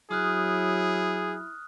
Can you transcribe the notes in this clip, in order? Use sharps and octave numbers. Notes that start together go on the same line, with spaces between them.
F#3 E4 G#4 D#6 F6 F#6